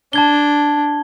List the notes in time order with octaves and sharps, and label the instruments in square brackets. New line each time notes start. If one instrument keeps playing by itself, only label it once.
[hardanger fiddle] D4 [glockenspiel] A5 G#6 G7